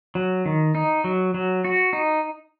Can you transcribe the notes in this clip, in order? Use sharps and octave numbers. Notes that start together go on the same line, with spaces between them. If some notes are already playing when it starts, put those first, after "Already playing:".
F#3
D#3
D#4
F#3
F#3
F#4
D#4